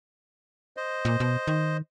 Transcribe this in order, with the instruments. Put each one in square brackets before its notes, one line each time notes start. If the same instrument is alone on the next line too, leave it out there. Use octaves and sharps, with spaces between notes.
[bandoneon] C5 D#5
[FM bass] A#2
B2
D#3